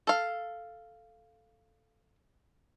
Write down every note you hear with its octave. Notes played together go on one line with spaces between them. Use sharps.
A4 F5